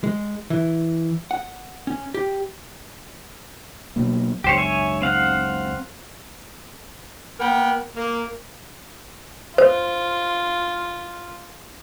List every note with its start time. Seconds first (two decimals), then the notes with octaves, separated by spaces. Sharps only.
0.04 G#3
0.50 E3
1.31 F#5
1.87 C#4
2.14 G4
3.96 B2 F#3 A#3
4.44 C#2 F#2 G4 C5 C#5
4.57 C#5 E5 G#5
5.02 C4 F5 F#5
7.40 A#3 B3 A#4 G5
7.95 A#3
9.58 F4 C5